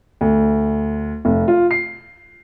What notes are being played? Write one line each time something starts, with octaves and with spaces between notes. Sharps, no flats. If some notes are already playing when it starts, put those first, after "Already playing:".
D2
F1
F4
C7